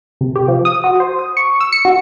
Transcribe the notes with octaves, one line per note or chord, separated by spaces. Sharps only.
C3
G4
F3
D#6
F#4
C5
D#6
C#6
E6
C#7
F#4